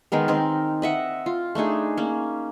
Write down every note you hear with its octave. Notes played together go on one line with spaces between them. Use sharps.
D#3 G#3 B3 A#4
C4 D#4 A#4
D#5 E5 F#5
F4
A3 D4 D#4 G#4
A#3 C#4